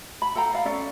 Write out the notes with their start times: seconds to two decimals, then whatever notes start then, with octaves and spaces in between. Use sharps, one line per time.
0.22 B5
0.35 A4 F5 G5 A#5
0.53 D5 F5
0.65 C#4 A4 D5